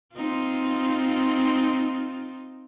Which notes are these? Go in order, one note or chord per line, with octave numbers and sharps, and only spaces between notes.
C4 D#4 F4